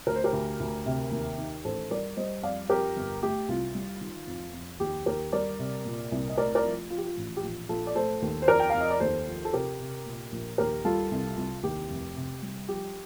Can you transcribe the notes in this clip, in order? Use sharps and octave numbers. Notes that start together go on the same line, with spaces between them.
D2 A#4
C5
G4 A#4
D2
D2
C3
D#2
D#3
A1 A4 C5
G3 A#4 D5
G3 C5 D#5
F2 D5 F5
F2 G4 A#4
G1
A3 G4
C2 F4
G3
D#3
F2
F2
D#2 G4
D#2 G4 A#4
G3 A#4 D5
C3
A#2
C2
D#5
A3 A#4 D5
A#4 D5
F3
F3 F4
G4
F4
A1
G4
A#1 F4
A#1 F4 A4
D5
A3 A4 C5
D#2
C5
F2 A#4 D5
G5
F2 F5
D#5
D5
D#2 A4 C5
F3
A4
C3 G4 A#4
C3
A#2
A#1
D#2 G4 A#4
G3 F4 A4
C2
C2
D#2 G4
F1
C3
G3
F3 G4